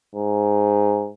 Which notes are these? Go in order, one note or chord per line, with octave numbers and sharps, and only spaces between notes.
G#2